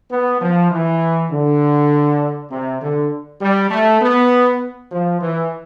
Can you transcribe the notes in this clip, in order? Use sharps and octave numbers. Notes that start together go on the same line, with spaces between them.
B3
F3
E3
D3
C3
D3
G3
A3
B3
F3
E3